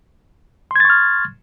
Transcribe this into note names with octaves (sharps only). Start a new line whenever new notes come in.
C6 C#6 F6 G#6 A6